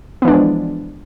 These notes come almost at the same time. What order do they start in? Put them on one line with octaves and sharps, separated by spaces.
B3 E3 D4 G#3 F3